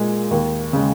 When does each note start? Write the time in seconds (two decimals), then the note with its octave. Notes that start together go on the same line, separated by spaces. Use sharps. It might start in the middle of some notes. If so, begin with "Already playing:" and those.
Already playing: A#2 G#3
0.31 D#2
0.73 C#3 G#3